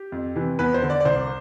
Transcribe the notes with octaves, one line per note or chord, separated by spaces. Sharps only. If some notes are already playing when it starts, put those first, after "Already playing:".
Already playing: G4
F2
C3 E3
E2 B4
C5
D3
D5
D5
C2 C5